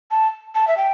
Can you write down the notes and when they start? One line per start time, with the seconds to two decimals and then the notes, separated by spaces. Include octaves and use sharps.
0.11 A5
0.55 A5
0.68 E5
0.77 G5